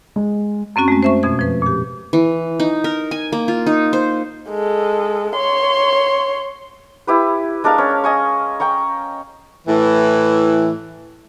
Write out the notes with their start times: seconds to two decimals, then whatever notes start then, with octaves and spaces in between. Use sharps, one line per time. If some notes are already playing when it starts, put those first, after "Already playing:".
0.16 G#3
0.76 F#2 C4 C#4 F#4 C#6
0.88 G#3 A3
1.03 C5 E5 C#6
1.23 F2 B2 G#6
1.39 F3 B4
1.62 A#2 G4
2.13 E3
2.59 D#4
2.84 A#4
3.11 G#5
3.32 A#3
3.48 F4
3.66 D#4
3.93 C5
4.50 G#3 A4
5.36 C#5 C6
7.07 E4 G4 B4
7.64 G#3 D4 A#4 F5
7.78 C#4
8.04 D#5 G#5 C#6
8.60 G5 A#5 C#6
9.67 A2 E3